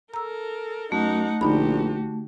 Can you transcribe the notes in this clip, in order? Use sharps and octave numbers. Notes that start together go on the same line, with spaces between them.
A4 A#4 A#5 E6
F#2 A3 D#4 F#5
A#1 D3 D#4 F#4 G4 B5